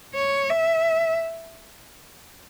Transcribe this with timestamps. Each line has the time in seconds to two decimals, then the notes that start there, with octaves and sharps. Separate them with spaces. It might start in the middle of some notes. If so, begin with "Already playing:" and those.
0.14 C#5
0.50 E5